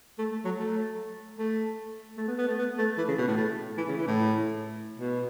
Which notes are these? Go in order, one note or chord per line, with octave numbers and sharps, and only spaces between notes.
A3
A3
F#3
A3
A3
A3
B3
B3
A3
B3
A3
E3
C#3
B2
A2
A3
E3
C#3
E3
A2
B2